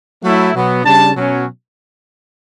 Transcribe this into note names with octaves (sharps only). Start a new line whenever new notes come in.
F#3 A3 E4
B2 F#3 B3
C#3 G3 D4 A5
B2 F#3 C#4